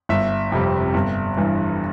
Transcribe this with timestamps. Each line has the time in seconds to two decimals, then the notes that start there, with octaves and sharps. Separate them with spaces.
0.09 G1 E5
0.52 F2 C3 G3
0.94 G1
1.37 G2 E3